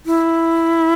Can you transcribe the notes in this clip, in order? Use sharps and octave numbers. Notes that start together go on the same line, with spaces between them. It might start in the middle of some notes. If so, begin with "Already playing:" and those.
E4